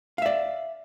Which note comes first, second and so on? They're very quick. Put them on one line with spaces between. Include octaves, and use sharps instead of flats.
F5 E5 D5